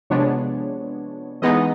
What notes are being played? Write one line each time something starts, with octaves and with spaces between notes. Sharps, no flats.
C3 F3 G#3 B3 D4 C#5
E3 G#3 B3 D#4 D#5